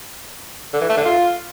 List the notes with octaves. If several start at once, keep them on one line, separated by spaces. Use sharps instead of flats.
D3
E3
A3
D3
F4